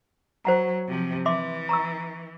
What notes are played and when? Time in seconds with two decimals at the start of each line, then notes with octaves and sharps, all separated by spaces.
0.45 F#3 C5 F#5 A#5
0.88 C3 F3
1.26 E3 E5 C6 D6
1.69 A#5 C#6 E6